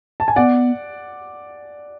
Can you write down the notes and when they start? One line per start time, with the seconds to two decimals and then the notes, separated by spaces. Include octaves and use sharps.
0.20 A5
0.28 G#5
0.36 B3 D5 F#5